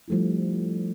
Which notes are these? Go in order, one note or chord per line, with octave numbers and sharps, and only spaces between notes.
F3 G3 A3 D4 E4